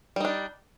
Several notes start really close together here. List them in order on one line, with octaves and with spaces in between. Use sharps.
G3 D#4 D4